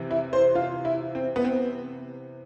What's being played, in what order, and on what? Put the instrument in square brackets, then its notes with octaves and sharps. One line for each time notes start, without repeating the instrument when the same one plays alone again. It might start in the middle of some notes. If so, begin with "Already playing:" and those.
Already playing: [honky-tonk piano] C3 E3
E4
C5
F4
E4
C4
B3
C4